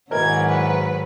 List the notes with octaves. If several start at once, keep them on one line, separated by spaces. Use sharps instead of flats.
G#2 B2 D#3 E3 F#3 A#4 G#6
B4